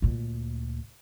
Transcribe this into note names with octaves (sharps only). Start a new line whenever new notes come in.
D2 A#2